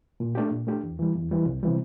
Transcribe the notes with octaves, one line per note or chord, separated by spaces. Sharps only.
A#2
A3 D4 G4
A#2
A3 D4 G4
E2
E3 G3
E2
E3 G3
C2
C3 E3 G3